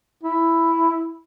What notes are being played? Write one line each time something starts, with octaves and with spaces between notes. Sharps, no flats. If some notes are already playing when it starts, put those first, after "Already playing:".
E4